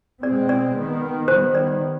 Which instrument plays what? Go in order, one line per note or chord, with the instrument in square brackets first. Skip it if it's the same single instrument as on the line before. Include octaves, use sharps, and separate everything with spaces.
[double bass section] B2 G#3 C4 [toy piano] D5
[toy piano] D5
[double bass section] D#3 B3
[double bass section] D#3 G3 B3 [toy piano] C5
[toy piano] D5